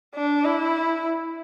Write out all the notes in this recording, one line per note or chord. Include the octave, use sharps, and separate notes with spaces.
D4
E4